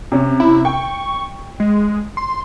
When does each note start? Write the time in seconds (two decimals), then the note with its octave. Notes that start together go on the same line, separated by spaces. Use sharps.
0.12 C3 C#4
0.40 E4
0.65 G5 C#6
1.60 G#3
2.17 C6